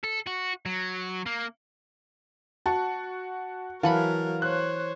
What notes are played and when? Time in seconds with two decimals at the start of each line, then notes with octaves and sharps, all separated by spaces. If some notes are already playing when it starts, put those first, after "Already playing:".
0.04 A4
0.27 F#4
0.66 F#3
1.26 A#3
2.66 F#4 A5
3.83 E3 F#3 A#4 F5 F#5 A5 B5
4.42 C5 C#5 F#6